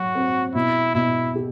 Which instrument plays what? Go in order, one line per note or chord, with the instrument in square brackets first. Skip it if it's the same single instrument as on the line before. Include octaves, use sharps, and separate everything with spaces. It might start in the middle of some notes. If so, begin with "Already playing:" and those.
Already playing: [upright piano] F#3 [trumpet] F#4
[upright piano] C4
[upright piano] B2 [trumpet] E4
[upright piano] B2 [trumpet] E4
[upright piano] G4